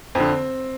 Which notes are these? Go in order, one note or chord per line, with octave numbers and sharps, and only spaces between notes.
F2 D3 C4